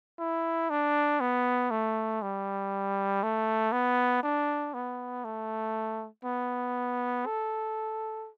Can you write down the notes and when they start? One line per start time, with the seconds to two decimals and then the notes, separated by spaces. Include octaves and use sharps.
0.19 E4
0.70 D4
1.20 B3
1.71 A3
2.22 G3
3.23 A3
3.72 B3
4.23 D4
4.74 B3
5.25 A3
6.25 B3
7.26 A4